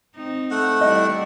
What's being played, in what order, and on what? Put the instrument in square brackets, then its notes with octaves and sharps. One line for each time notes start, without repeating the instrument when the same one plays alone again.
[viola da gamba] C4 D#4
[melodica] A3 F#5
[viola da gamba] G3 D4 E4 [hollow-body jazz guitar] D#5